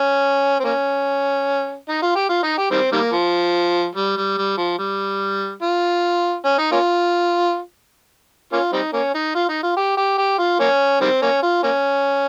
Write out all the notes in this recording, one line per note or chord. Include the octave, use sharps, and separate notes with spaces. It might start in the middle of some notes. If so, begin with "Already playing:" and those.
Already playing: C#4
C4
A#3 C#4
D#4
F4
G4
F4
D#4
G4
D#3 G3 C4
D#3 G3 A#3
F3
G3
G3
G3
F3
G3
F4
C#4
D#4
A#3 C#4 F4
A#3 C#4 F4
G3 C4 D#4
A#3 C#4
D#4
F4
D#4
F4
G4
G4
G4
F4
A#3 C#4
D#3 G3 C4
A#3 C#4
F4
A#3 C#4